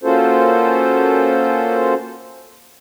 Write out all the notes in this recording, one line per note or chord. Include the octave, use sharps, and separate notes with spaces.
A#3 C#4 F4 F#4 A4 C5